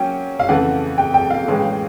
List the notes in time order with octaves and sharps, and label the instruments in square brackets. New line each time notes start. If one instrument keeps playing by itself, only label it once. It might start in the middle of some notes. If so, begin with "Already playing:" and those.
Already playing: [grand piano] F#3 A#3 C#4 [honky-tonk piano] G5
[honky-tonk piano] F5
[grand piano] F2 C#3 E3 A3 [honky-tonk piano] F#5
[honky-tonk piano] G5
G5
F5
[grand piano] A2 E3 G#3 C#4